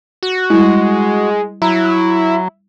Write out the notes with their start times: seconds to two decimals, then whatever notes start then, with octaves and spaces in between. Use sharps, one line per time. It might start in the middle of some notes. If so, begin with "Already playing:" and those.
0.23 F#4
0.50 G3 G#3 E4
1.62 F#3 E4 A#5